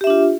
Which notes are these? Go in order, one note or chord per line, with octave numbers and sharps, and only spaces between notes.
D4 F4 G4 E5